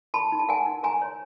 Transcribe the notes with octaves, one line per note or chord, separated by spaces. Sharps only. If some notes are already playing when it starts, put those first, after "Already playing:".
A#4 A5 B5
D#4
A5
A#4 F#5 G#5
D#4
A#4 G#5 A#5
C#5